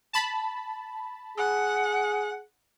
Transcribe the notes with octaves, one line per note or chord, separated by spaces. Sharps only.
A5 B5
G#4 F#5